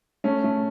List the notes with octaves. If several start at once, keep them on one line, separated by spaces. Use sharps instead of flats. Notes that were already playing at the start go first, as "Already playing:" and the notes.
A3 C#4
A3